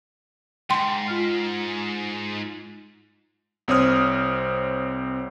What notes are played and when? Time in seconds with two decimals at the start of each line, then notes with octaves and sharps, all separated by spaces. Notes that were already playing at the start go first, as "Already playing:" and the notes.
0.70 G#2 G5 C6
1.08 F4 F6
3.68 C2 C4 C#5 D#6 F6